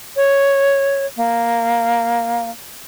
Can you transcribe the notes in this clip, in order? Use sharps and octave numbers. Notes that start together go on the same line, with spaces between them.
C#5
A#3